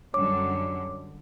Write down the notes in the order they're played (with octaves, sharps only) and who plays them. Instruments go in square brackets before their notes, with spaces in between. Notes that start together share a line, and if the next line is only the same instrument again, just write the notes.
[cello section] F#2 D3 G3 [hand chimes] C#5 D6